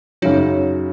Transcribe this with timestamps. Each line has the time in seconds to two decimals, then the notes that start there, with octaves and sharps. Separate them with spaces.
0.22 F#2 C#3 F#3 D#4 F#4